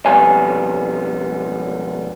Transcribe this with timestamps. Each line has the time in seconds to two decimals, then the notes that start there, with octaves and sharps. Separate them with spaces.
0.06 B1 F2 G3 B3 G#5